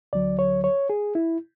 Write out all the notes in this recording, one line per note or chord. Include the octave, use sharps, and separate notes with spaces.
D2 D3 F#3 D5
C#5
C#5
G#4
E4